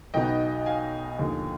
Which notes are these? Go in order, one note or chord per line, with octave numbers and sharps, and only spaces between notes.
B1 B2 B3 D#4 D#5 G5
F5 G#5
D#2 D3 F3